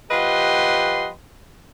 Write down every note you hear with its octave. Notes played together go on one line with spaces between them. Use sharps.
F3 G4 B4 D#5 F#5 C6